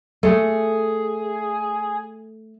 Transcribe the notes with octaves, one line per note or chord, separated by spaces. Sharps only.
A3 G#4